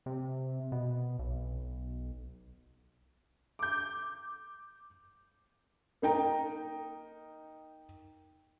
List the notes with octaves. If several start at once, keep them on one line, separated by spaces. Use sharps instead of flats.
C3
B2
B1
D6 G6
A#3 D#4 G5 A#5